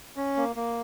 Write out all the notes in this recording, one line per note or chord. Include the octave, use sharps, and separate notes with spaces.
C#4
A#3
A#3